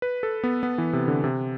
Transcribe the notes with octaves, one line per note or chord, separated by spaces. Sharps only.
B4
A4
B3
B3
E3
C3
D3
C3